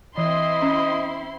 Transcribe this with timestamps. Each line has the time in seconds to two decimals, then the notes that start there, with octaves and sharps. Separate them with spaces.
0.18 E3 C4 E4 D#5 C6
0.62 C#4